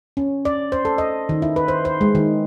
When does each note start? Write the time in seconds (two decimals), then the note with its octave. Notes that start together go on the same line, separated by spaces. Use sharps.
0.17 C#4
0.45 D5
0.72 C5
0.85 A4
0.98 D#5
1.29 D#3
1.42 E4
1.56 B4
1.68 C5
1.85 C5
2.01 G#3
2.15 D#3